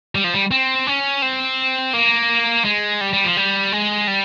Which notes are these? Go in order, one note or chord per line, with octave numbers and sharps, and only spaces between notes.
G3
F3
G3
C4
C#4
C4
A#3
G#3
G3
G3
F3
G3
G#3
G3